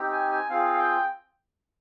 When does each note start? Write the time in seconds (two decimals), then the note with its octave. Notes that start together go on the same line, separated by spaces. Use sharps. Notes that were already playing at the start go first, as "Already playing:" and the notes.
Already playing: C4 D#4 G4
0.12 G#5
0.31 G#5
0.49 C4 F4 G#4 F5
0.73 F5
0.78 G5